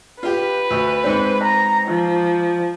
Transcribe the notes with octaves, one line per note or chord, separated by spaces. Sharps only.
F4 G4 B4
D2
G#2 C4
A#5
F3